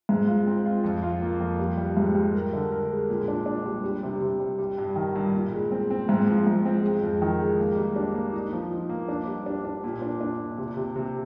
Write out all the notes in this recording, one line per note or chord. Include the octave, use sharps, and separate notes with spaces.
G#2
F4
C4
F4
F2
F4
A#3
F2
G3
G3
G#2
G3
A#4
D3
A#4
G#3
A#2
D4
D4
G3
G3
C3
C3
G3
G3
G2
D#3
G2
A#2
G#3
C4
C4
G#2
F3
G#2
C4
G#3
F2
D#3
G#3
A#3
G3
D4
A#3
D#4
F3
D#4
A#3
D4
G3
D4
D4
A#2
D4
D4
A#2
C3
C3
C3